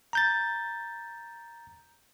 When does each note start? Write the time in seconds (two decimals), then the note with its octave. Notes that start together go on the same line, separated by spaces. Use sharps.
0.13 A#5 G6 A6